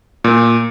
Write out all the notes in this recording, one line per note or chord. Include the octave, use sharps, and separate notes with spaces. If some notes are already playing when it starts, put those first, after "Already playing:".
A#2